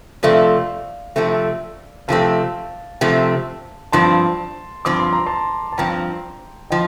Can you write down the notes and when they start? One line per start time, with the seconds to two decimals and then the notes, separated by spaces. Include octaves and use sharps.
0.23 C3 F3 A3 C4 D5 F5
1.16 C3 F3 A3 C4
2.08 C3 F3 A3 C4 F5 A5
3.01 C3 F3 A3 C4
3.92 G2 F3 C4 A5 C6
4.85 G2 F3 C4 D6
5.00 C6
5.13 A#5
5.26 A5 C6
5.72 A5
5.78 G2 F3 C4 G5 A#5
6.70 F3 D#5 G5